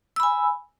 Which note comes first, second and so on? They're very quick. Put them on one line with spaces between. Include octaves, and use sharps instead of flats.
E6 B5 G#5